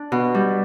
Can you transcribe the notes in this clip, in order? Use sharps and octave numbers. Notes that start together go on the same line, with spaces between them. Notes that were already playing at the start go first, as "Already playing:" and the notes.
Already playing: D4
B2
G3